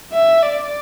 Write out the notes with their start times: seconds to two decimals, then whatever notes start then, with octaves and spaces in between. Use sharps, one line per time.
0.13 E5
0.43 D5